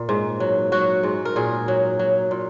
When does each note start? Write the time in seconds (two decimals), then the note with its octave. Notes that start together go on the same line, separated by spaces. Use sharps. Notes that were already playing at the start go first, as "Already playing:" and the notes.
Already playing: A#2
0.09 G#2
0.40 F#3
0.72 F#3 F#4
1.03 G#2
1.25 A#4
1.36 A#2 G#4
1.68 F#3
1.99 F#3
2.31 A#2